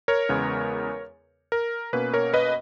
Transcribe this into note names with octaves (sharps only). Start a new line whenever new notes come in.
A#4 C#5
E2 C#3 G#3 B3
A#4
B2 A#3 C#4 B4
A#4 C#5
B4 D#5